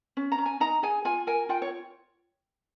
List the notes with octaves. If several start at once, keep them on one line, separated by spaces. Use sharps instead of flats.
C#4
A#5
C#4
G#5
D#4 A#5
G#4 G#5
F4 G#5
A#4 G#5
F4 G5
C#5